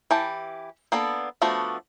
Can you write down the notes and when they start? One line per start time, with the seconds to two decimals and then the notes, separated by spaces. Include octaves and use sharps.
0.11 E3 G4 A5
0.92 A#3 B3 D4 A4
1.42 F3 A3 B3 D4 F#4